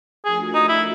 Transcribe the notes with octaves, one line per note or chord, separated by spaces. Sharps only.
F3 A3 D4 F#4 G#4 A#4
D#4
E4